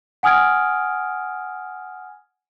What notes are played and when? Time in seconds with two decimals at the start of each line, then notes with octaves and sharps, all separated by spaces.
0.23 F#5 G#5 D#6 F6 G#6 D7